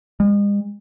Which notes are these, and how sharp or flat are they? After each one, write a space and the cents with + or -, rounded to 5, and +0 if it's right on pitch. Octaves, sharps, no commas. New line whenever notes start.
G#3 -40